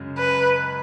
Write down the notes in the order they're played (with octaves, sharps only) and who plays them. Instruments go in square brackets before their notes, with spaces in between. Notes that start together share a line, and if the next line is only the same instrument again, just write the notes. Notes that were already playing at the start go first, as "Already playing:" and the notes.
Already playing: [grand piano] F#2 C#3 G#3
[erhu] B4